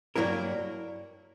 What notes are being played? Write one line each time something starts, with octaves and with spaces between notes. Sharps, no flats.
G2 F#3 A#3 E4 A#4